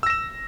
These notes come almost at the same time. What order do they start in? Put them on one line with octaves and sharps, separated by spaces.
E6 A#6 E7